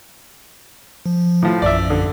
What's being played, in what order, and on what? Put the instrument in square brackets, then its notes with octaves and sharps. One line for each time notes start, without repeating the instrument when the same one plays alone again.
[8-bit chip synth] F3
[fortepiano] A2 F3
[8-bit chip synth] A#1 F#2 [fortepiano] D5 E5
[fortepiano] D3